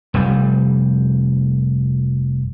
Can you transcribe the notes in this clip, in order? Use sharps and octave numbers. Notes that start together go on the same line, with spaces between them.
F1 G3